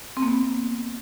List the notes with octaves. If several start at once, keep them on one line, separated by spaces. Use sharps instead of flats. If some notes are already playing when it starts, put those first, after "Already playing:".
C4
A#3
B3